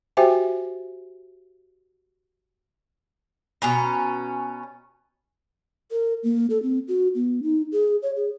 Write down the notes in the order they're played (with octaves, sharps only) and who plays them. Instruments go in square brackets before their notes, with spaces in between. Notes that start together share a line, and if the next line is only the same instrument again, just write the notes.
[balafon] F#4 G4 C5 E5 G5 G#5
[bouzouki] B2 C#4 A#5
[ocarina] A#4
A#3
A4
C4
F#4
B3
D#4
G#4
C#5
G#4